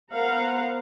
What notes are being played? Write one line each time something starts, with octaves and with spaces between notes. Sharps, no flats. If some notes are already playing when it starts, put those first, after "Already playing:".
B3 A#4 C5 F5 F#5 A#5